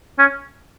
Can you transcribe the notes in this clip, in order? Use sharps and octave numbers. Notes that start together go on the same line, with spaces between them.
C#4